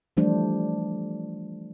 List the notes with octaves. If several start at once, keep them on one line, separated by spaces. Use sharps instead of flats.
E3 F3 G3 A3 D4 C5